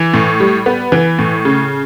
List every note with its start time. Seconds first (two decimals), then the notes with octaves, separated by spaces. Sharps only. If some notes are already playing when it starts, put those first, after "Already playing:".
Already playing: E3
0.14 A2
0.40 G3
0.66 B3
0.92 E3
1.19 A2
1.45 C#3